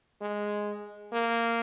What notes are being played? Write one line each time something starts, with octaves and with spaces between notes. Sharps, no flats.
G#3
A#3